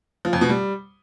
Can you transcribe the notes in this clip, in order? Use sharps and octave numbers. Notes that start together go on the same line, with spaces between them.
F3
F2
B2
G3